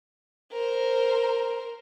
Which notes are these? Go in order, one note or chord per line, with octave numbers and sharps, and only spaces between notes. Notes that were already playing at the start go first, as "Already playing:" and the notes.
A#4 C5